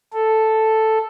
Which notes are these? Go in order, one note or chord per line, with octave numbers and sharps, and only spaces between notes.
A4